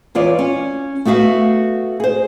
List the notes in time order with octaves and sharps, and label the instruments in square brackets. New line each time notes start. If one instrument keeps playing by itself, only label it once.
[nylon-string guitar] E2 F4 C#5 D5
C#4
A3 B3 F#4 E5 F5
G#4 C5